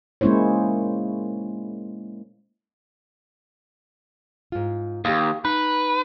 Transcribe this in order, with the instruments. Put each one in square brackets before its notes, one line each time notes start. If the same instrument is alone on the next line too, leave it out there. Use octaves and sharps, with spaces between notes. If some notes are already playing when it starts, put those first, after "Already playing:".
[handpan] G#3 A#3 C#4 E4 C5 C#5
[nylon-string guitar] G#2 F4
[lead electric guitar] D#2 [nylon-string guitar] G4 F5
[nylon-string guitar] D#4 [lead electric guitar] B4